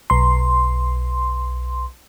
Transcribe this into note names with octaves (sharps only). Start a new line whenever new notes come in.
B1 C6